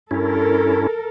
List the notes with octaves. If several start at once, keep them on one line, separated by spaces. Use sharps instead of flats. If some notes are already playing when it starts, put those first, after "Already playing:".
G2 C#4 E4 A4 A#4